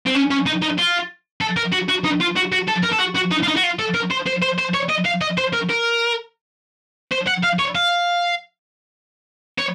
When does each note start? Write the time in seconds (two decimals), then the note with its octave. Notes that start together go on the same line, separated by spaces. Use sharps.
0.06 C4
0.15 C#4
0.30 C#4
0.46 D#4
0.62 D#4
0.78 F4
1.41 A4
1.57 A#4
1.72 F#4
1.89 F#4
2.04 D#4
2.21 F4
2.36 F#4
2.52 F#4
2.68 A4
2.84 A#4
2.93 A4
3.00 F#4
3.16 F#4
3.31 D#4
3.43 F4
3.48 D#4
3.56 F#4
3.63 F4
3.79 A4
3.94 A#4
4.11 C5
4.27 C5
4.42 C5
4.58 C5
4.74 C#5
4.89 D#5
5.05 F5
5.21 D#5
5.38 C5
5.53 A#4
5.69 A#4
7.12 C5
7.27 F#5
7.44 F5
7.59 C#5
7.75 F5
9.58 C#5